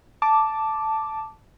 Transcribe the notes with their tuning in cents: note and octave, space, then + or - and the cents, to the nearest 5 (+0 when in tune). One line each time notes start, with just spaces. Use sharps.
A5 +0 D6 +0